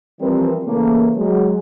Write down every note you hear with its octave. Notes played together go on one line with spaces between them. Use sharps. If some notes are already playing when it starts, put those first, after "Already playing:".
E3 F3 G3 C4 A#4 B4
C#3 E3 A3 A#3
F#3 G#3